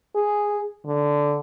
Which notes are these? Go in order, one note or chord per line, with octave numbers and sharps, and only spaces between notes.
G#4
D3